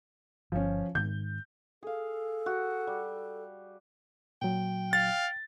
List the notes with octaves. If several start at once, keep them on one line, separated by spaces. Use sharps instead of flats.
G1 F3 C#4
G#2 D#3 G6
G#4 A4 F5
F#4
G3
A#2 F#3 G5
F5 A6